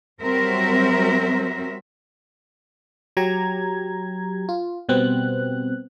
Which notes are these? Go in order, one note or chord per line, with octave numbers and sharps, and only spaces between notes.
F#3 G3 C4 F#4 A#4 E5
F#3 G4 A#5 G#6
F4
B2 G3 B3 C4 F#6